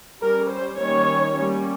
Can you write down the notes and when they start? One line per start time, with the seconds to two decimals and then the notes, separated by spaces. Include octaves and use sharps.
0.21 G3 C#4 A#4
0.50 C5
0.77 D#3 G3 A#3 C#4 C#5
1.34 G3 A#3 C#4